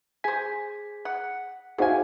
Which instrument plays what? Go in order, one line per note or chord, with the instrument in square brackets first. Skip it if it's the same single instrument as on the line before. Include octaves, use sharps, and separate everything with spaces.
[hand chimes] G#4 B6 [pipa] C5 G#5
[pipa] F#5
[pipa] C3 G#5 [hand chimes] D#4 G#4 [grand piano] F#4 C5 F5